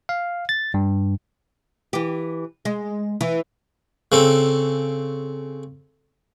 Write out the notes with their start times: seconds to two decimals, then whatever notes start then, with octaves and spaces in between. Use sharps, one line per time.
0.09 F5
0.49 A6
0.74 G2
1.93 E3 G4
2.65 G#3
3.21 E3
4.12 C#3 C4 A4